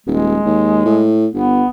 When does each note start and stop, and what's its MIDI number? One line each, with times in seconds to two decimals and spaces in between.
0.07 0.39 27
0.07 1.17 56
0.45 0.85 39
0.85 1.27 45
1.34 1.63 31
1.34 1.68 59